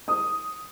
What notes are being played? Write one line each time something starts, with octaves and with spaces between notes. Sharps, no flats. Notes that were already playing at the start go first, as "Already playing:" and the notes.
D#6